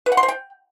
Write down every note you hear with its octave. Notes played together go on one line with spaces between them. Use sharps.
B4
F#5
C6
C5
G5